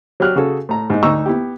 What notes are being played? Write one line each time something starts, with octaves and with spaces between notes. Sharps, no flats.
F#3 F#4 G4 F6 F#6
C#3 F#4 G#4 A4
A2 A#5
G#2 D#4 D#5
D2 D#4 A#5 C#6 E6
B3 E4 G4